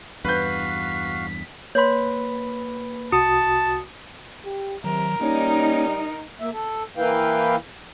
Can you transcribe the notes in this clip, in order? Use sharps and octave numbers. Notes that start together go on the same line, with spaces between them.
E2 G2 F#4 B4 F5 G6 B6
A#3 B4 C#5 B5 C6
C2 F#4 A5 D#6 C#7
G4
C3 D#3 F#3 A#4
G3 A#3 C#4 D#4 C#5
A#3 E5
A4
E3 A#3 E4 B4 F5 G5